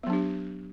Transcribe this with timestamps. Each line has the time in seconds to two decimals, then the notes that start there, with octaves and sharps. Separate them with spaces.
0.03 B3
0.07 F#3
0.10 D4
0.13 G4